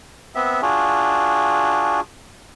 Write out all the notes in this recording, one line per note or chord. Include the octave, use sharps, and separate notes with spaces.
B3 C4 E5
D4 F4 F#4 G#4